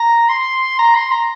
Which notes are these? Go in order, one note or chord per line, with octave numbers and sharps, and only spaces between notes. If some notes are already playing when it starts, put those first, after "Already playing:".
Already playing: A#5
C6
A#5
C6
A#5